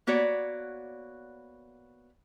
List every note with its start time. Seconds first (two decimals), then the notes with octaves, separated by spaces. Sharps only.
0.07 A#3 B3 F#4 C#5 D5